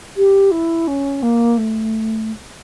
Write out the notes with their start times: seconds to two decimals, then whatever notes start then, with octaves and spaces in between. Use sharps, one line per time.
0.17 G4
0.51 E4
0.87 C#4
1.22 A#3
1.57 A3